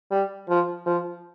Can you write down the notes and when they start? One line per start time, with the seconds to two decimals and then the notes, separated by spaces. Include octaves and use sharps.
0.11 G3
0.49 F3
0.86 F3